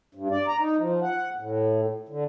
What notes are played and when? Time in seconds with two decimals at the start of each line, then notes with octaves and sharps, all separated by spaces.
0.15 G2
0.31 D5
0.48 A#5
0.59 D#4
0.77 F3
1.02 F#5
1.37 A2
2.09 D3